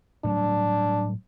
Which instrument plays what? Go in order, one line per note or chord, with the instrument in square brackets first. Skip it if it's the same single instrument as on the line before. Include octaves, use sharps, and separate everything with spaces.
[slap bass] A2 F#3 G3 [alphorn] D4